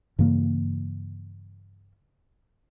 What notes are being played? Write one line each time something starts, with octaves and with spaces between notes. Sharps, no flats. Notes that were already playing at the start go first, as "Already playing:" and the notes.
G2 C#3 E3 A#3